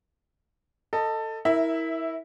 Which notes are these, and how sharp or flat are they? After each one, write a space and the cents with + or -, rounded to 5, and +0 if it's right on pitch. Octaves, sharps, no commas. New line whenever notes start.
A4 +15 D#5 +0
E4 -20 A#4 +0 E5 +0